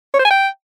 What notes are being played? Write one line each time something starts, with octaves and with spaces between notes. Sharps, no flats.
C#5
C5
G#5
G5